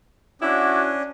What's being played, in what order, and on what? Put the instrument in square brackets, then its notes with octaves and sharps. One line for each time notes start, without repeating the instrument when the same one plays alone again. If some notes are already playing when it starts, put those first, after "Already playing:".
[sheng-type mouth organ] C#4 D4 [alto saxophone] E4 [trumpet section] F#4 D6